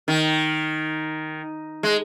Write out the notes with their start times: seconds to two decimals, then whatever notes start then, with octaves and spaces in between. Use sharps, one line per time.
0.08 D#3
1.83 G#3